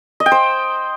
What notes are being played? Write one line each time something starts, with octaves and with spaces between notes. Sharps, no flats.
D#5
G5
C5